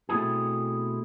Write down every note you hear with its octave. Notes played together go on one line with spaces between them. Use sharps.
B2 A3 C4 E4 G#4